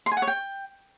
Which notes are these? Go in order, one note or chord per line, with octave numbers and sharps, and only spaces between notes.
C6
G#5
F#5
C#5
G5